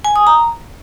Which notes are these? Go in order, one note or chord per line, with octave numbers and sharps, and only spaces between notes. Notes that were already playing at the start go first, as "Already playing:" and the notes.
G#5
D#6
A#5